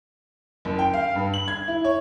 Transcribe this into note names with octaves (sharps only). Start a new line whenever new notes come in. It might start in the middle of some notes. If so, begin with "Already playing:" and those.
F#1
G5
F5
G2
F#7
G#6
E4
C#5